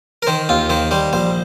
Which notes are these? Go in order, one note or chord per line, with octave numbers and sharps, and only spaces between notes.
A#4
D#3 C5
D#2 F4
D#3 C5
G3 C5
A#1 C5